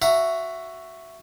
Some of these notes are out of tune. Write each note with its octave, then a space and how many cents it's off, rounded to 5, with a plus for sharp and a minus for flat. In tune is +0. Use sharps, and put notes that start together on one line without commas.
F#4 +0 E5 +15 A#5 +5